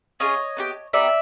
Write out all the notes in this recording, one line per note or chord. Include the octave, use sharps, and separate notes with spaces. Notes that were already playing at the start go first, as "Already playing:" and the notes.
C#4 F4 G#4 C#5 D#5
B3 D#4 G4
B3 D#4 G4 D5 E5